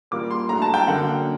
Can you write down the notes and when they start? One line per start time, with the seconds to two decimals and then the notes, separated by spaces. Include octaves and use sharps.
0.11 A#2 G3 A#3 D6
0.31 C6
0.49 G2 F#3 A3 A#5
0.62 A5
0.74 G5
0.87 F#2 D3 F#3 A#3 F#5